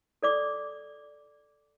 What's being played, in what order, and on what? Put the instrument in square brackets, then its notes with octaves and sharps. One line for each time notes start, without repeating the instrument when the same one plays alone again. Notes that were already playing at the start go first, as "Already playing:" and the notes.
[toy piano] A4 D5 D6